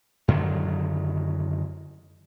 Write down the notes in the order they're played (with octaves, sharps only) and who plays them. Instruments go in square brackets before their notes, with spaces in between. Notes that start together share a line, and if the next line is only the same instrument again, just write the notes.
[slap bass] F#2 D3 D#3 F#3